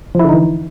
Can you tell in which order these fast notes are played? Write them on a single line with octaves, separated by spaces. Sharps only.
F3 E4 D3 D#4 E3